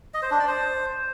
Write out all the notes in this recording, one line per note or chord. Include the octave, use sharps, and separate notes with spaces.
D#5
C5
D4
D5
C5